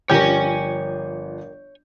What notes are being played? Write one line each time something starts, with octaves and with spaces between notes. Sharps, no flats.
G1 F3 G4 A#4 C#5 G#5 G6